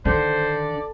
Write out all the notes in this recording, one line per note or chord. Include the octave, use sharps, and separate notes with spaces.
D3 D#3 C5 D5